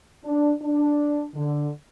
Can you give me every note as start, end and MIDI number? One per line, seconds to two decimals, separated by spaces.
0.25 0.52 62
0.62 1.25 62
1.35 1.69 50